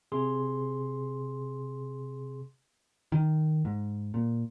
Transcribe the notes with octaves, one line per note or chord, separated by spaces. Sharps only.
C3 G#4 C6
D#3
G#2
A#2